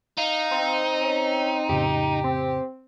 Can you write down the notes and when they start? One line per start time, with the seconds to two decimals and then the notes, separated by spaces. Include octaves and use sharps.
0.17 D#4 F5
0.51 C4
1.01 C#4
1.69 F2 A2 C#3 G4
2.24 C4